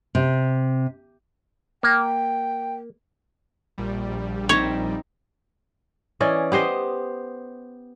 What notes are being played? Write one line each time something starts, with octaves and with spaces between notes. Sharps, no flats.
C3
A#3 G5
A#1 G3
C4 D#4 C#5 E5
E3 C#4 D5 D#5
B3 G4 C5 D#5